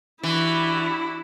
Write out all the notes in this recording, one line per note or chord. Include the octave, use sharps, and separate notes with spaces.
E3 D4 E4 F#4 G4